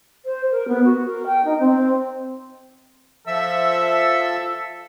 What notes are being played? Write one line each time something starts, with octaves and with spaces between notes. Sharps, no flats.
C5
A#4
B3
F#4
A#4
G5
D#4
C4
F3 A4 E5 E6